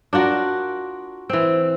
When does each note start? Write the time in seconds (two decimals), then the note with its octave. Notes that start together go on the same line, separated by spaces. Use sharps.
0.13 D4 F4 F#4 A#4
1.29 E3 C4